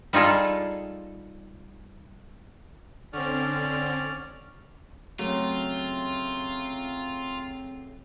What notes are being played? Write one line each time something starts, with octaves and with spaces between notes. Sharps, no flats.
G3 D#4 F4 G#4 A4
D3 C4 C#4 D5 F6
C#3 F#3 A3 A#3 C4 F4